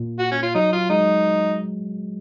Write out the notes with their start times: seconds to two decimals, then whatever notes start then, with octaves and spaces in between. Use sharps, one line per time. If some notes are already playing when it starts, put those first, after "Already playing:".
Already playing: A#2
0.19 F#4
0.31 C#4
0.43 F4
0.54 F#3 D#4
0.73 F4
0.90 G#3 D#4